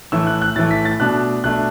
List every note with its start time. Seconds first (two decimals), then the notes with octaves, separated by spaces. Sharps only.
0.12 A2 E3 A3 E6
0.27 F#6
0.42 F#6
0.56 A2 E3 A3 A6
0.71 B6
0.85 A6
1.00 B2 A3 D4 F#6
1.44 B2 A3 D4 F#6